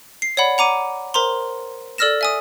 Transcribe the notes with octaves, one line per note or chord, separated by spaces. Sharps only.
C7
C#5 D5 F#5 B5
F#5 A#5 D6 D#7
A#4 C5 A#5 C6
A4 D5 E6 F6 A#6 E7
E5 G#5 D#6